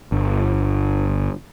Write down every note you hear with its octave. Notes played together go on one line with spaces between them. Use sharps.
G1